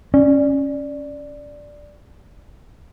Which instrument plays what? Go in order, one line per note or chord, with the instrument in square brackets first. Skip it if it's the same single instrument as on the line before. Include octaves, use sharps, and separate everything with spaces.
[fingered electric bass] C#4 [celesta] D5